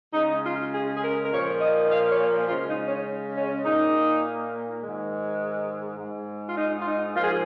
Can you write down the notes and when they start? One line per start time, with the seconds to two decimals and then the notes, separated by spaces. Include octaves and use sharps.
0.13 C#3 G#3 D#4
0.44 F4
0.73 G#4
0.97 G#4
1.02 A#4
1.24 A#4
1.30 A#2 F3 A#3 C#5
1.60 D#5
1.77 D#5
1.89 F5
2.08 C#5
2.48 C#3 G#3 F4
2.67 D#4
2.86 C#4
3.35 C#4
3.64 A#2 A#3 D#4
4.81 G#2 D#3 G#3
5.98 G#2 G#3
6.49 F4
6.56 D#4
6.82 F4
6.86 D#4
7.14 G#2 F3 A#3 F4
7.23 G#4